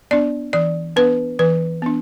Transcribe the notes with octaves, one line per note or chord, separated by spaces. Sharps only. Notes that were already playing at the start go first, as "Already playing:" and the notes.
B3 D4 D5
E3 D5
B3 D4 B4
E3 B4
B3 D4